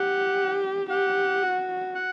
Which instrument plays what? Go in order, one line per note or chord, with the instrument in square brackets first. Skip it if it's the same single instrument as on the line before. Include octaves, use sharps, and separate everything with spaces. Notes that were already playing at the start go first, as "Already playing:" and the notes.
Already playing: [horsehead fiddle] G4 [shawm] F#5
[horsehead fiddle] G4 [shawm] F#5
[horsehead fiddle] F#4
[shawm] F#5